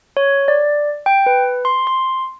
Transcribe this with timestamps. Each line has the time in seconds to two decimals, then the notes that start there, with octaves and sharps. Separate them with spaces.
0.17 C#5
0.48 D5
1.06 G5
1.26 B4
1.65 C6
1.87 C6